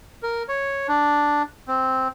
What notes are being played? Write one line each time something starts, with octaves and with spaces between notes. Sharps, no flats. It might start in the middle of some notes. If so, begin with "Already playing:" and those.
A#4
C#5
D4
C4